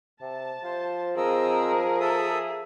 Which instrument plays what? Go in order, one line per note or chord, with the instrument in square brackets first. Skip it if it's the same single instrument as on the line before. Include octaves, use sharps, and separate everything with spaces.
[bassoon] C3 [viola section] A5
[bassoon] F3 [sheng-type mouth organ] C5
[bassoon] F3 [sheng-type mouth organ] C4 D#5 E6 [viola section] G#4 [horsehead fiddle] A#4
[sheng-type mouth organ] A4 E5 D#6